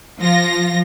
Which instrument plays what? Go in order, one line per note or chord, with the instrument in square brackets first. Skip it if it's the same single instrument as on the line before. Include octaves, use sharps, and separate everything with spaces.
[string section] F3 F4 A#6